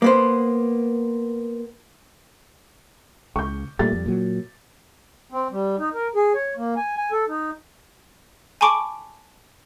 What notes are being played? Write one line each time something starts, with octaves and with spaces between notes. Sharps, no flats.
A#3 B3 C5
C#2 C#6 G6
A#2 G3 A3 A6
F2 G3
A#2 F#3
C4
G3
D#4
A#4
G#4
C#5
A#3
G#5
G#5
A4
D#4
G#5 A5 B5 C#6 D6 D7